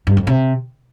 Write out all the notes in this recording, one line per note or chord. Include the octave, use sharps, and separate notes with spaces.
G2
F2
C3